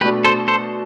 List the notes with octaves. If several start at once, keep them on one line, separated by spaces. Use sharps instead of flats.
B2 A3 D4 G4 B4
A4 C5
A4 C5